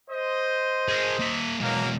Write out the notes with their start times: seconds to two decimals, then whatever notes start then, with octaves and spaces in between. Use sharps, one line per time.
0.10 C5 D#5
0.89 G#4 A#4
1.20 A#3 E5
1.60 B2 F#3 G#3 A#3